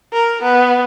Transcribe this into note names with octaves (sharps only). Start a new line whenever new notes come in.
A#4
B3